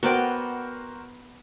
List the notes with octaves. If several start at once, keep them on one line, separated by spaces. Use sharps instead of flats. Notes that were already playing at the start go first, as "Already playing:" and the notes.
B3 F#4 A#4 C5 D5 G5